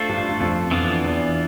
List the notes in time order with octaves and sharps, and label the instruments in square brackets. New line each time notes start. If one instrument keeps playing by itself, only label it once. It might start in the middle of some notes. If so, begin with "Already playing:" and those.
Already playing: [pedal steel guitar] A3 D4 F4 A4 C5
[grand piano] G2
G2
F2
[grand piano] F2 [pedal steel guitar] E3 B3 D4 F4
[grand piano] E2